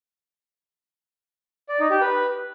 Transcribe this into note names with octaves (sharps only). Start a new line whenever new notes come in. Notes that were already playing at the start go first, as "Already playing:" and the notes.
D5
D#4
G4
B4